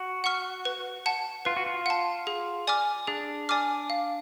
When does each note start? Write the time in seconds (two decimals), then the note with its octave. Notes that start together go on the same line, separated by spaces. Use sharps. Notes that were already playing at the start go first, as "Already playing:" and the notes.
Already playing: F#4
0.24 F#5 C#6 F6
0.65 B4
1.06 F#5 A5
1.45 F4 B4
1.57 F#4
1.66 F4
1.86 F#5 A5
2.27 G#4
2.67 D5 G#5 D6 F6
3.07 D4 G#4
3.49 D5 G#5 D6 F6
3.90 F5